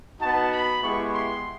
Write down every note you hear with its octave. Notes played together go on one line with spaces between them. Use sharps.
B3 D#4 F#4 A5
B5
G#3 B3 E4 G4 C#6
C6